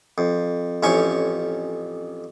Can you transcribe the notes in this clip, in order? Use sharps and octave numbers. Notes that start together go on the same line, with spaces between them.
F2
A1 F2 C#4 C#5 G#5 C#6